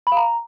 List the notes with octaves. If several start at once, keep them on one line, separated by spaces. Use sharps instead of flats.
B5
F5
A#5